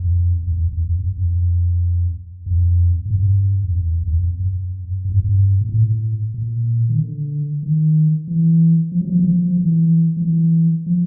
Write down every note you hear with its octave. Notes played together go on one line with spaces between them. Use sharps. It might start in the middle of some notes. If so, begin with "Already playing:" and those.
Already playing: F2
F2
E2
E2
F2
F#2
F2
F2
G#2
G2
F2
E2
E2
F2
F#2
G2
F#2
G2
A#2
A2
A#2
D#3
D3
D#3
E3
F3
F#3
F3
E3
F3
F3
E3
F3
E3
F3